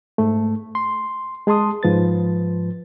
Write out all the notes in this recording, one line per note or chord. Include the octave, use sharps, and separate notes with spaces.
G#2 A3
C6
G#3 G#4 A5 C6 D#6
G#2 F3 B4 A6